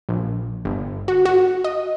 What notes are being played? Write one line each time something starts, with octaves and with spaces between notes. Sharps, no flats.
A#1
G1
F#4
F#4
D#5